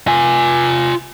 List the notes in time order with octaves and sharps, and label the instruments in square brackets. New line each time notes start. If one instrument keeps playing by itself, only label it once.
[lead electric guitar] F4 G#5